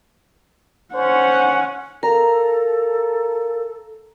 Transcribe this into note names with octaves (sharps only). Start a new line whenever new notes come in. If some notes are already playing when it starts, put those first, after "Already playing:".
C#4 C5 F#5
A4 A#4 F5 A#5